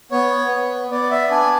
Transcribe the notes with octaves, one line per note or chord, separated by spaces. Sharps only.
B3 C#5
B3
B3 D5
E5
D4 G#5